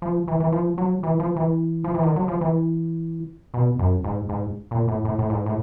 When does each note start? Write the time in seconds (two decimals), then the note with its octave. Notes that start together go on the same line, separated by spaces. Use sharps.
0.02 F3
0.28 E3
0.40 E3
0.52 F3
0.78 F#3
1.03 E3
1.20 F3
1.36 E3
1.84 F3
1.94 E3
2.03 D#3
2.16 F#3
2.28 F3
2.41 E3
3.54 B2
3.79 F#2
4.04 G#2
4.29 G#2
4.71 A#2
4.88 A2
5.05 A2
5.19 A2
5.30 G#2
5.46 A2